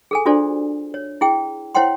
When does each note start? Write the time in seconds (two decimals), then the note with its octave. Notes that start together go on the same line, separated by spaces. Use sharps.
0.11 G#4 A4 G#5
0.26 D4 F4 F#4 A4 C5 D5
0.94 C#5
1.21 E4 G#4 G5
1.75 E4 C5 C#5 F#5 G5 C6